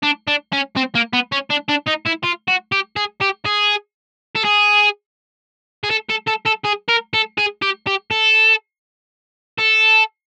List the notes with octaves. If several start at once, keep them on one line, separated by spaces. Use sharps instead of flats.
D4
D4
C#4
C4
A#3
B3
C#4
D4
D4
D#4
E4
F4
F#4
G4
G#4
G4
G#4
A4
G#4
G#4
A4
A4
A4
A4
G#4
A#4
A4
G#4
G4
G4
A4
A4